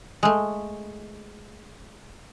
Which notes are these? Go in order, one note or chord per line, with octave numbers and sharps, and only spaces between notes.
G#3 A3